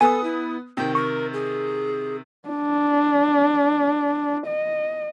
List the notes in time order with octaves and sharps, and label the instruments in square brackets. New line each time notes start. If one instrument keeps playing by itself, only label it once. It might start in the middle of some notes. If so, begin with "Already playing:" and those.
[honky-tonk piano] B3 D#6 [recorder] A4 [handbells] G#5
[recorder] E4
[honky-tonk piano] C3 D#3 [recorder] G5
[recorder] A#4 [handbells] C#6
[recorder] G#4
[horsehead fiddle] D4
D#5